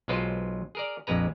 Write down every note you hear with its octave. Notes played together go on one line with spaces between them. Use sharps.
B1 F#3 G#3 F4 B4 C5
G#4 A#4 D5
A#1 F2 G#3 B4 A#5